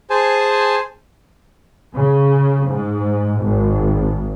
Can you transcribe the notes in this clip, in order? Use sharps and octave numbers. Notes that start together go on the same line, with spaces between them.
G#4 C5 G#5 A5
C#3
G#2
G#1